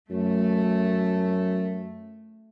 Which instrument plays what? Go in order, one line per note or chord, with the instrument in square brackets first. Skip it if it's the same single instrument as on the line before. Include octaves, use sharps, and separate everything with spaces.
[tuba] F#2 [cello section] A3